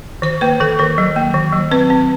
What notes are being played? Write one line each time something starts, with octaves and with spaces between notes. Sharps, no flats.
D#3 C5
A#3 B4
D#3 A4
D#3 A#4
F#3
A#3
D#3
F#3
C4 B4
C4